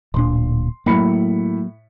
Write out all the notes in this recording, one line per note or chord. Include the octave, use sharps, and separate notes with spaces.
D1 A#2 D4 C6
A2 F#3 A#3 B5 C#7